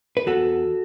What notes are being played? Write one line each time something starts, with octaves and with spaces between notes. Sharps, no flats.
B4
E2 F#4 A4